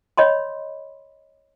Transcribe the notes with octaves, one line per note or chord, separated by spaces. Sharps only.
C#5 D#5 B5 C6